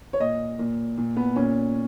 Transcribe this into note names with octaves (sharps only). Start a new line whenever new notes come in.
C#5
A#2 D#5
A#2
A#2
B3
A#2 C#4